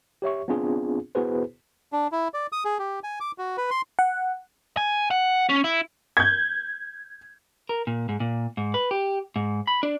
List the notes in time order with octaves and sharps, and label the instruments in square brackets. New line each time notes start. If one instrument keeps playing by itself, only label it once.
[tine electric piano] G4 C#5 E5 C#6
B3 C4 D4 F4 G#4
B3 E4 F#4 G#4 B4 C5
[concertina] D4
E4
D5
D#6
G#4
G4
G#5
D6
F#4
B4
C6
[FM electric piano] F#5
[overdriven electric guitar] G#5
F#5
C#4
E4
[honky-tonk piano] G6 G#6
[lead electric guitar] A#4
A#2
G#2
A#2
G#2
B4
G4
G#2
B5
D4